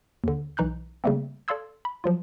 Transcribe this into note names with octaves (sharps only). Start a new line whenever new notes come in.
D#2 D3
B1 E3 D#4 F#6 G6
C#3 G3 A3 A#3 C4
A4 D5 F5 C6 E6 G#6
B5
F3 F#3 F4